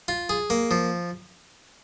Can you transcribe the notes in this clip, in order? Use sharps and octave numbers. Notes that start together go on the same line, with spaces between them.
F4
G#4
A#3
F3